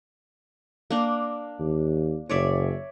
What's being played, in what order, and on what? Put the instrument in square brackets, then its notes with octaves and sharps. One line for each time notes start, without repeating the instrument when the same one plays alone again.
[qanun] A#3 D4
[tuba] D#2
[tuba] F#1 [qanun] C#5 D5 E5